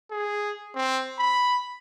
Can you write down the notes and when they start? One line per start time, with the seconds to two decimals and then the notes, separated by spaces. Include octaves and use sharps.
0.11 G#4
0.75 C4
1.19 B5